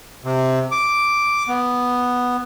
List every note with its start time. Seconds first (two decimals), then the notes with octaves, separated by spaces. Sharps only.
0.25 C3
0.72 D6
1.48 B3